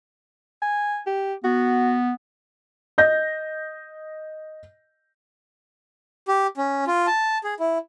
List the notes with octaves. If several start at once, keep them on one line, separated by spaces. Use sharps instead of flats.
G#5
G4
B3 F#4
D#5 G6 A#6
G4
C#4
F4
A5
G#4
E4